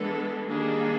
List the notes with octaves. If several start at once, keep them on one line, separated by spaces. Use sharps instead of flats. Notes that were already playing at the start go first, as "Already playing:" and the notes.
Already playing: E3 G#3 B3 D4 A4
D#3 G3 A#3 D4 G#4